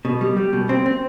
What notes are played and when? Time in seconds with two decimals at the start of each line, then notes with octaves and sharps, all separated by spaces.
0.05 B2
0.21 G3
0.37 G3
0.53 B2
0.69 C4
0.86 C4